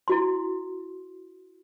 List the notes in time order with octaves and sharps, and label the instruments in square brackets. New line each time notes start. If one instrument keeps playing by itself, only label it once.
[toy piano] E4 F#4 C6